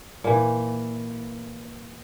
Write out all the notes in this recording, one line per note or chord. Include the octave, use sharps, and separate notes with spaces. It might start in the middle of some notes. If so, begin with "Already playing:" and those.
A#2 E3